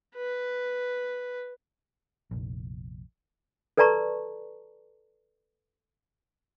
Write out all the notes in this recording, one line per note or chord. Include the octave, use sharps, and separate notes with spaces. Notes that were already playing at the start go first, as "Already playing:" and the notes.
B4
F1 A#1
A4 B4 D5 A5 A#5 C#6